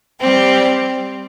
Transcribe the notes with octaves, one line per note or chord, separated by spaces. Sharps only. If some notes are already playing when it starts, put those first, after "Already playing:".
G3 C4 G4